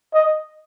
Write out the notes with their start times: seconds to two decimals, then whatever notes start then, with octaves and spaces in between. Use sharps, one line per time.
0.14 D#5